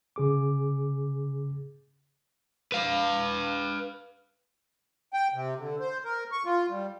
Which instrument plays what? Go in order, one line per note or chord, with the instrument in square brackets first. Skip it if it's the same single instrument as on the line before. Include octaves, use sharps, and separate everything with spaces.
[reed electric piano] C#3 G#4 D6
[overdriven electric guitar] B4 F5
[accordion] G5
C3
D3
C5
A#4
C#6
F4
G3